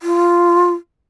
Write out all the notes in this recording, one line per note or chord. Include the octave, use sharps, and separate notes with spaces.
F4